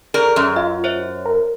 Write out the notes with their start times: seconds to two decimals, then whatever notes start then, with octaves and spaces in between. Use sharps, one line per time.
0.14 G#4 A#4 D5 A#5
0.36 F#2 C6
0.56 F4 D#5
0.84 C5 C#5 E5
1.25 A#4